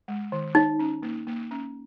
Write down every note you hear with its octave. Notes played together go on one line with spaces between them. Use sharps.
G#3
D#3
D#4 C#5
C#4
A#3
A#3
C#4